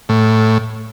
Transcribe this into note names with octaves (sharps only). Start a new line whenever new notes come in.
A2